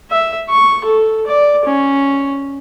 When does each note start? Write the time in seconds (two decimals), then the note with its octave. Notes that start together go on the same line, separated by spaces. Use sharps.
0.11 E5
0.50 C#6
0.85 A4
1.27 D5
1.65 C#4